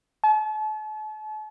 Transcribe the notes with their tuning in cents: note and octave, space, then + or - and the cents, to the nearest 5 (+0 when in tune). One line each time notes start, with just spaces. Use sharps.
A5 -40